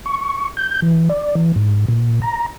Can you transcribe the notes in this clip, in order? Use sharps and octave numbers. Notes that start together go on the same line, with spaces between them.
C#6
G6
E3
D5
E3
G#2
A#2
A#5